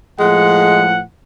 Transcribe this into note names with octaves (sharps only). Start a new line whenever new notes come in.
A2 F3 G#3 F#5